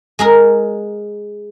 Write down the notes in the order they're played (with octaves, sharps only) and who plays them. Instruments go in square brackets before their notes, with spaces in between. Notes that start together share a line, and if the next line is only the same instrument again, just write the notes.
[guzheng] G#3 G#4 A#4